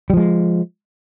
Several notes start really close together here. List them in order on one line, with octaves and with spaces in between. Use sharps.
G3 F3 G#3